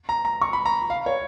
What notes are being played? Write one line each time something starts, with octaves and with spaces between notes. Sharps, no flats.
A#5
A#5
C#6
B5
A#5
F5
C#5